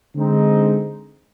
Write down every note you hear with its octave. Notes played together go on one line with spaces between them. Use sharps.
D3 G#3 C4 D#4